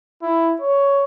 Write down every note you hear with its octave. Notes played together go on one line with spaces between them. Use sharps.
E4
C#5